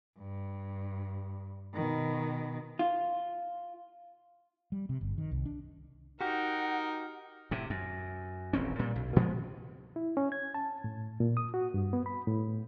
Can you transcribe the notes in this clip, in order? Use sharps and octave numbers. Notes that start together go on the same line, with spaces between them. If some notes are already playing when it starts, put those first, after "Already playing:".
G2
B2 D#3
F4
G3
C3
G1
D#3
C2
D4
D#4 F#4 G4 A#4 F#5
A2 C3
F#2
D#1 A1 C4 C#4
A#2 G3
B1
A#2 F3 G#3 B3
E4
C#4
G#6
A5
A2
A#2
D#6
F#4
G2
B3
B5
A2